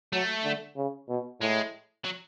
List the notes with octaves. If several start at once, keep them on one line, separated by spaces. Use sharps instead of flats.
F#3 A3
D3
C#3
B2
A2 G#3
F#3